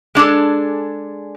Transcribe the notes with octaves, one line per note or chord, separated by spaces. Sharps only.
G#3 D4 G#4 A4